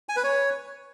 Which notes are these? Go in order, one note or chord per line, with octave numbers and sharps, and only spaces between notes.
G#5
B4
C#5